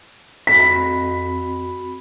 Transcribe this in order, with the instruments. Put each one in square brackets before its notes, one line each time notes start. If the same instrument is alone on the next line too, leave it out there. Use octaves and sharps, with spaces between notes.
[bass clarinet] F2 [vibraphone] C4 F#4 B5 [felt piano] B6